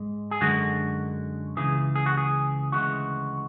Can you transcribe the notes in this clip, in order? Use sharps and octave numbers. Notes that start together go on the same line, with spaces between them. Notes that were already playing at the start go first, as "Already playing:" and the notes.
Already playing: G#2 G#3
G#4
F#2 D3 G#3 F#4
C#2 C#3 E3 G#4
G#4
F#4
G#4
D2 C#3 E3 G#3 F#4